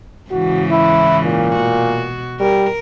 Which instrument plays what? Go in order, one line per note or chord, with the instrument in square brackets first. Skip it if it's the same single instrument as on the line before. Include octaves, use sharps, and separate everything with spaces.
[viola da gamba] G#2 C#3 E3 [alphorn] F#4
[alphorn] E4
A#2
[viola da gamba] B2 F#4
[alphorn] G3 [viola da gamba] A#4